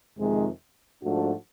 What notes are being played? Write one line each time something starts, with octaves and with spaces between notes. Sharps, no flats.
F2 C3 D#3 G#3
G#2 F3 A3 D4 F#4